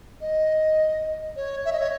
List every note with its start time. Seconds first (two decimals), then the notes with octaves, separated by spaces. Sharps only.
0.21 D#5
1.36 C#5
1.65 E5
1.73 D#5
1.80 C#5